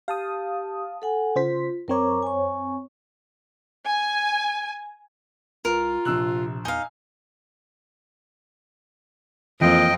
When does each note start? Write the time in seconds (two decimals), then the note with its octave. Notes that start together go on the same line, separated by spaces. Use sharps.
0.08 G4 F5 A5 D#6
1.02 A4 F#5 G#5
1.36 C#3 F4 C5 B6
1.88 F#2 C4 A#4 C#5 A#5 D6
2.23 G#5 C#6
3.85 G#5
5.65 C2 F4 A#4
6.05 A#1 C3 E6 F#6
6.65 E2 D#4 F5 G#5
9.61 F2 E3 F3 A#3 D#5 G5